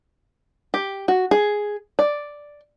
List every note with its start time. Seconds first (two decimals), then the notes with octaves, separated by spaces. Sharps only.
0.74 G4
1.08 F#4
1.31 G#4
1.99 D5